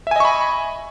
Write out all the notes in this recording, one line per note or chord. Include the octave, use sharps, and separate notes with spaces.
D#5 E5 G#5 B5 C#6